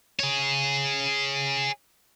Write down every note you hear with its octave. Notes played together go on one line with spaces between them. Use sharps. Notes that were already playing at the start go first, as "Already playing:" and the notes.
G#4 C#5